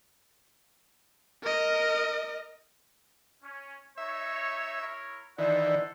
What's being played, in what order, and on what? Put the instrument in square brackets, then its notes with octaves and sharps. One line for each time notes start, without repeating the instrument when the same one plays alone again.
[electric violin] A#4 D#5
[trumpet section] C#4
[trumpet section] D#4 C#5 [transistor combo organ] E5
[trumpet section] E4 A#4 C#5
[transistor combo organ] D#3 E3 [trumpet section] A4 C5 F#5 [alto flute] D5